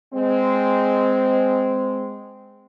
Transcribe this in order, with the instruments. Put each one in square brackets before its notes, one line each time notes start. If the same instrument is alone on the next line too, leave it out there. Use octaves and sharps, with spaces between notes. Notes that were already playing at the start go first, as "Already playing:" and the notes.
[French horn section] G#3 C4